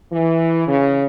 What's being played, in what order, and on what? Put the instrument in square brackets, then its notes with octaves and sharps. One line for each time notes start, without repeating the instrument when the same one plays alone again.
[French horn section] E3
C#3